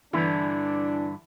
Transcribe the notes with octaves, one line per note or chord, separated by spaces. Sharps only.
G2 D3 E3 D4 E4